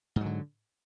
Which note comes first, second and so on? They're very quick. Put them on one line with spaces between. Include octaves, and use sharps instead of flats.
G#2 F#3 D3